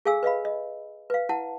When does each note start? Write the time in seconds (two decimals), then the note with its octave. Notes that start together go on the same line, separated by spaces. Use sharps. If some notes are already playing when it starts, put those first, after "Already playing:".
0.05 G#4 A4 F5 G#5 E6
0.23 B4 D#5 F5 B5
0.45 D#5
1.10 B4 F5
1.29 E4 F#5 A5